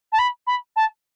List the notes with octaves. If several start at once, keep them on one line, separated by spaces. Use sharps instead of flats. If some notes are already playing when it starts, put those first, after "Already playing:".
A5
B5
B5
A5